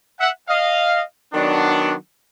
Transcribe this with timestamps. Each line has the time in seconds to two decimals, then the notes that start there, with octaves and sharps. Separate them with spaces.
0.20 E5 F#5
0.49 D#5 F5
1.33 D#3 F#3 B3 D4